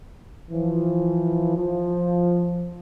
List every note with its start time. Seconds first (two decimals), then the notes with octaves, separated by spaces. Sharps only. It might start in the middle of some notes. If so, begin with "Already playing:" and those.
0.50 E3 F3
1.56 F3